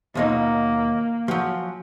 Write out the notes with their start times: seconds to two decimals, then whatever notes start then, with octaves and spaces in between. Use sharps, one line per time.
0.15 D#2 B2 A#3 D#4 F4 C#5 D#5
1.28 F3 F#3 F4 F#4 G#5